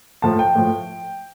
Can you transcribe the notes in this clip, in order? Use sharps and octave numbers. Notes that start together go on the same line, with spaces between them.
A2 F3 A5
G5
A2 F3